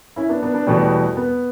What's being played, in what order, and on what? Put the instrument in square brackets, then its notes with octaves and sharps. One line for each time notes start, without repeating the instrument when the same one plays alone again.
[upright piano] C#4 E4
B3 D4
B3 D4
B3 D4
[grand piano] E2 B2 G3 [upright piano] A3 C#4
[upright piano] B3